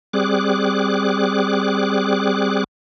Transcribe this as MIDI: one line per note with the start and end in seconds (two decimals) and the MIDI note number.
0.13 2.64 55
0.13 2.64 60
0.13 2.64 68
0.13 2.64 86
0.13 2.64 90